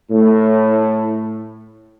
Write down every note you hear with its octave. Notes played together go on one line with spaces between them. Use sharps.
A2